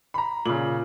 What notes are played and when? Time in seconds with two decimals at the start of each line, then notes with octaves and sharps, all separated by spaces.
0.14 A#5 B5
0.45 A#2 C#3 F#7